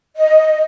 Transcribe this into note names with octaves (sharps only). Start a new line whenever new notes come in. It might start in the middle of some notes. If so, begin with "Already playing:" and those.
D#5